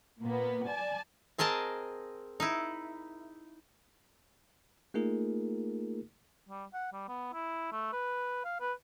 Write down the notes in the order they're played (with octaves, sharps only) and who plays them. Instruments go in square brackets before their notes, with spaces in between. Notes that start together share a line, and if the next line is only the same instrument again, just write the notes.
[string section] A#2 A#3 B3
D5 G#5 A5
[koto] C4 G#4 A#4 D#5 A5
D#4 E4
[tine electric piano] A3 A#3 D#4 F4 G#4 A#4
[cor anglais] G3
F#5
G3
B3
E4
A3
B4
F5
B4